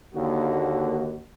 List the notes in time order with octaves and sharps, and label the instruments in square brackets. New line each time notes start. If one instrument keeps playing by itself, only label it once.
[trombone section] D#2 D3 D#3 A#3 F#4